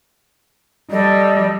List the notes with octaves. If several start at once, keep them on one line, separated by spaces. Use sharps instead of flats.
G3 A4 D5 D#5